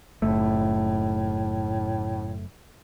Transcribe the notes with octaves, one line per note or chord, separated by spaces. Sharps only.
F#1 A2 A3